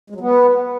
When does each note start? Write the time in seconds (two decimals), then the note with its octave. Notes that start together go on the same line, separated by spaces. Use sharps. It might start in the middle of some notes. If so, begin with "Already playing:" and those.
0.10 G#3
0.15 F#3
0.20 B3